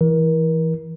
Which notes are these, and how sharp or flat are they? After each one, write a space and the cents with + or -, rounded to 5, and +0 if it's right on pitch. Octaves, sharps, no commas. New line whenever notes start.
E3 +0 A#4 +35